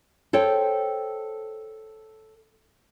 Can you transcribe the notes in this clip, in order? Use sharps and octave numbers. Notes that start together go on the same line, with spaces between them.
A4 C5 C#5 G5